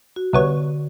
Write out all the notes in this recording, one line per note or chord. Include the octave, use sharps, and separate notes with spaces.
F#4
C2 D3 B3 C#5